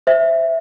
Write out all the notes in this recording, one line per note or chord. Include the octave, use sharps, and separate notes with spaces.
C5 E5